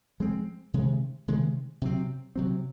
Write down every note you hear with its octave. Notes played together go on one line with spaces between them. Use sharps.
F3 G#3 C4
C3 D#3 G#3
C3 D#3 G#3
C3 F#3 C4
C3 F#3 C4